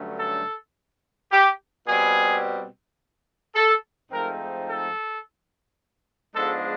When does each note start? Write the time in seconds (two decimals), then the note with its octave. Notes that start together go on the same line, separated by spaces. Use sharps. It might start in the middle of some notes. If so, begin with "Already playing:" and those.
Already playing: G2 D3 F#3 A3 C#4
0.19 A4
1.32 G4
1.87 B2 G3 C4 G#4
3.55 A4
4.11 G#2 F3 A3 C4 D#4 A#4
4.67 A4
6.35 G#2 F3 G#3 B3 D4 A4